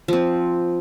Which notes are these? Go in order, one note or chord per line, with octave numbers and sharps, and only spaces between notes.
F3 C4